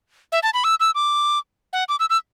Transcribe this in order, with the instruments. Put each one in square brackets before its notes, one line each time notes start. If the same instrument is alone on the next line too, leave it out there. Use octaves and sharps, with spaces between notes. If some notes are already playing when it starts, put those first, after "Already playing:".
[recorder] E5
A5
B5
E6
E6
D6
F#5
D6
E6
E6